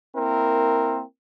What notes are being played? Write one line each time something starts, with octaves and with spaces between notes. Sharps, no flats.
A#3 C4 E4 A#4